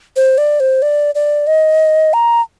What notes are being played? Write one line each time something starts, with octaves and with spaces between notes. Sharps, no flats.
C5
D5
C5
D5
D5
D#5
A#5